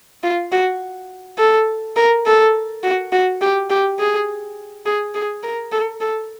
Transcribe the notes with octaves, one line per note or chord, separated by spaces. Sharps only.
F4
F#4
A4
A#4
A4
F#4
F#4
G4
G4
G#4
G#4
G#4
A#4
A4
A4